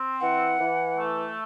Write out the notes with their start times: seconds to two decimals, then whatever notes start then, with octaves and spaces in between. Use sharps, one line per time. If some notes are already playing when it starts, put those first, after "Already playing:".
Already playing: C4
0.21 E3 F#5
0.60 E3
0.98 A3